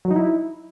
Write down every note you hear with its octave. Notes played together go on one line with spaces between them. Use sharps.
F#3
D#4
E4